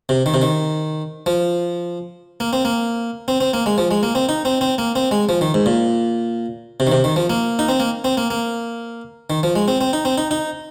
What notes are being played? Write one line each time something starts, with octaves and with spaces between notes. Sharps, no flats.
C3
D#3
C3
D#3
F3
A#3
C4
A#3
C4
C4
A#3
G#3
F3
G#3
A#3
C4
D#4
C4
C4
A#3
C4
G#3
F3
D#3
G#2
A#2
C3
D#3
C3
D#3
F3
A#3
D#4
C4
A#3
C4
A#3
A#3
D#3
F3
G#3
C4
C4
D#4
C4
D#4
D#4